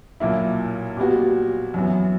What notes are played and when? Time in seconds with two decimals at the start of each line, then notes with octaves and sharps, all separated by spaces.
0.20 B1 A#2 A#3 E4
0.97 A#2 G3 B3 F#4
1.74 F#2 E3 B3